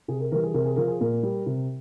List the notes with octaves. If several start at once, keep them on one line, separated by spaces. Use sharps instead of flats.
C3 G#4
A#4
E3 G3 A#4
G#4
C3 A#4
G#4
F3 A#4
G#4
A#2 A#4
G3
C3